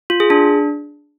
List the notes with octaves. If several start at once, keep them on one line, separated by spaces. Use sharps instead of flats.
F4
G#4
D4